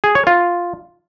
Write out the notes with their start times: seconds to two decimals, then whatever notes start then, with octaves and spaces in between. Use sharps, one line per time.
0.04 G#4
0.15 C#5
0.27 F4